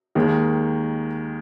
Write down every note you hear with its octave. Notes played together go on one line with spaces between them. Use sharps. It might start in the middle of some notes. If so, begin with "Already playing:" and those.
D#2 D#3 G#3